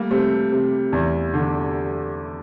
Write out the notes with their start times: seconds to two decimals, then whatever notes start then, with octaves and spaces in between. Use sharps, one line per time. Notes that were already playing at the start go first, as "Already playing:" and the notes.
Already playing: G3 A3 A#3
0.11 C3 A3 C4
0.52 C3
0.92 E2
1.34 D3